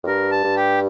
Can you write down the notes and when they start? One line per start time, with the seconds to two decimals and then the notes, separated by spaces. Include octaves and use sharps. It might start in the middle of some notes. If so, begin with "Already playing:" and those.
0.03 F2
0.07 G2 A#4
0.31 A5
0.44 G2
0.56 G4